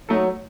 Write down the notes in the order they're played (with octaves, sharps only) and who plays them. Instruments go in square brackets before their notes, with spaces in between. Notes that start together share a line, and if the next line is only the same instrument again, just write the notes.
[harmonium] F#3 [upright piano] A3 D#4 A4